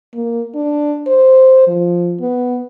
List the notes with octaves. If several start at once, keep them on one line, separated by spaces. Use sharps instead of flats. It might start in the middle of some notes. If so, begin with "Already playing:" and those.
A#3
D4
C5
F3
B3